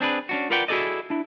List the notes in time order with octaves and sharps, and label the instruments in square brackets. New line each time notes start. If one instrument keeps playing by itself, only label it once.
[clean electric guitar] C4 D4 G#4 B4
C#4 D4 F#4
F4 A#4 B4 D5 F#5 G5
E4 F#4 G#4 A4 D5 D#5
D4 E4